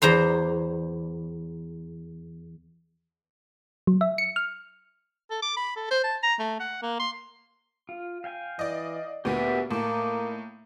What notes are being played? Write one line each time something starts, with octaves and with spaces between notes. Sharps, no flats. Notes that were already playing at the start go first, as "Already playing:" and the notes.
E2 C5 A#5 C6
F#3
E5
C#7
F6
A4
D6
B5
A4
C5
A5
A#5
A3
F#5
A#3
C6
F4
F5 G5 G#5
E3 D5 D#5
D2 A#2 B3 G4 E5
A2 A#3 D#4 A5 D6